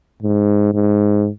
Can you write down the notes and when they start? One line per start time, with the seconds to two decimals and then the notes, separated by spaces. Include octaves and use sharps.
0.22 G#2
0.74 G#2